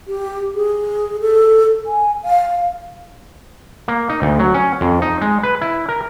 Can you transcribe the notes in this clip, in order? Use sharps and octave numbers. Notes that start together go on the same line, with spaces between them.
G4
G#4
A4
G#5
F5
A#3
D#4
D2
F#3
C#4
F2
D#4
G#3
B4
E4
A#4